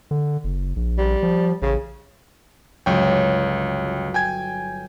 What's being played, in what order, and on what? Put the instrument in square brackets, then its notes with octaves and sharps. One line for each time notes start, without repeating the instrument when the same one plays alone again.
[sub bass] D3
F#1
A#1
[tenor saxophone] G3
[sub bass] F3
[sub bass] A1 [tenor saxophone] C#3
[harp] G1 F#3 C#5 [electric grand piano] C#2 G5
[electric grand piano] G5 G#5 G#6